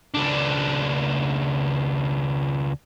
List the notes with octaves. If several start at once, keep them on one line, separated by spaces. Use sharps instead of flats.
C#2 D4